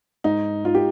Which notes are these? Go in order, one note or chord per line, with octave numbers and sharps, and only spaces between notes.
G#2 D#4
D#4 F4
G4